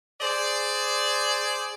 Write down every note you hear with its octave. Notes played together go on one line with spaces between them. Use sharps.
G#4 C5 D5